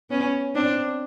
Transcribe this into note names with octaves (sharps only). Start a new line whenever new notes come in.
B3 C#4
C4 D4